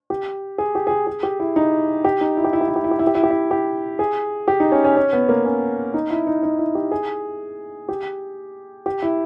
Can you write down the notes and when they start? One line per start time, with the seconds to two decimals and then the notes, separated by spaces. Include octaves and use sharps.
0.10 G4
0.58 G#4
0.75 G4
0.87 G#4
0.91 G4
1.07 G#4
1.23 G4
1.40 E4
1.56 D#4
2.04 G4
2.21 D#4
2.37 E4
2.44 G4
2.53 E4
2.61 G4
2.68 E4
2.76 G4
2.84 E4
2.91 G4
2.99 E4
3.07 G4
3.15 E4
3.23 G4
3.31 E4
3.51 G4
3.99 G#4
4.48 G4
4.60 D#4
4.72 C#4
4.84 C#4
4.96 C#4
5.13 B3
5.29 A#3
5.45 C#4
5.94 D#4
6.10 E4
6.27 D#4
6.43 D#4
6.59 E4
6.75 G4
6.91 G#4
7.89 G4
8.86 G4
9.02 E4